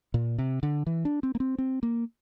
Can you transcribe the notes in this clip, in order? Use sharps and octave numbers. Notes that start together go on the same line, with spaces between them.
A#2
C3
D3
E3
D4
C4
A#3
C4
C4
A#3